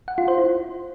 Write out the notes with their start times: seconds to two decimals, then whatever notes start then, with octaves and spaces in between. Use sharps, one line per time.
0.08 F#5
0.18 F4
0.28 C5
0.38 E4